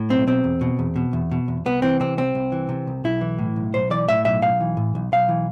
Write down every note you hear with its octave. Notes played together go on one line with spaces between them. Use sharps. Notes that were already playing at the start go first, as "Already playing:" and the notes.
Already playing: A2
B1 C4
B2 C4
E2
B2
E2
B2
E2
B2
E2
C2 B3
E3 C4
C3 C4
C2 C4
C2
E3
C3
C2
B1 E4
E3
A2
B1
B1 C5
E3 D5
A2 E5
B1 E5
B1 F5
E3
A2
B1
B1 F5
E3